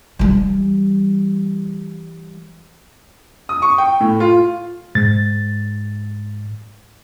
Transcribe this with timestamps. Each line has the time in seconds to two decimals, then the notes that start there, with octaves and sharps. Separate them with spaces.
0.19 E3 G3
3.49 D#6
3.62 C#6
3.78 G5
4.00 A2
4.20 F4
4.95 G#2 A6